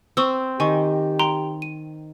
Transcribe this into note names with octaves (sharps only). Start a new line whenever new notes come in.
C4 C#6 D#6 E6
D#3 G4 G#5 C#6
G5 A#5 C6
D#7